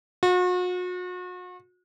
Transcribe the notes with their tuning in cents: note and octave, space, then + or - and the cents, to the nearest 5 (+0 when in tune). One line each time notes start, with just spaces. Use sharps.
F#4 -40